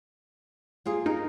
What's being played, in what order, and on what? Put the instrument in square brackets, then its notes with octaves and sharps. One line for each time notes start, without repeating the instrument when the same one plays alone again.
[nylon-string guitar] A#3 F4 G#4
[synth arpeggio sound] D#4 [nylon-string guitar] A#4